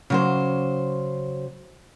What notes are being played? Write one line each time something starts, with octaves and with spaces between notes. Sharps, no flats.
C#3 F#3 C5